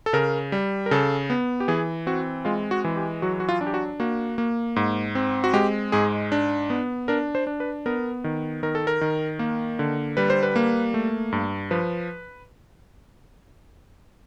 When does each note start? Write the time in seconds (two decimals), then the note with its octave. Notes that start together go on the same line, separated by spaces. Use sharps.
0.06 A4
0.13 C#3 A#4
0.52 G3
0.86 A#4
0.91 C#3 A4
1.30 B3
1.60 G4
1.68 E3 G#4
2.07 C4 F#4
2.45 G#3 F4
2.71 F#4
2.84 E3
2.96 G4
3.22 F#3 F#4
3.40 F#4
3.49 F4
3.61 D4
3.67 G4
3.74 F#4
4.00 A#3 F#4
4.38 A#3
4.76 G#2
5.15 C4
5.44 F#4
5.53 G#3 G4
5.92 G#2 G#4
6.32 D4
6.70 B3
7.08 D4 A#4
7.35 C5
7.47 D4
7.60 B4
7.86 B3 A#4
8.24 D#3
8.63 D#3 A#4
8.75 A4
8.87 A#4
9.01 D#3
9.39 A#3
9.79 D3
10.17 G3 B4
10.30 C5
10.43 B4
10.56 A#3
10.94 A3
11.32 G2
11.71 F3 B4